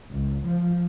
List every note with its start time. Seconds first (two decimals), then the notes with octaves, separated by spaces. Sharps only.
0.11 C#2
0.47 F3